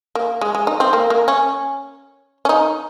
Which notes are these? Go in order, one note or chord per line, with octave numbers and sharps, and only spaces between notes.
A#3
G#3
G#3
D#4
C4
A#3
A#3
C#4
C#4
D#4